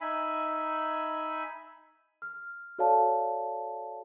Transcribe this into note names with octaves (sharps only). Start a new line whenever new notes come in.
D#4 E5 G#5 B5
F6
F#4 A4 C#5 D5 F5 A5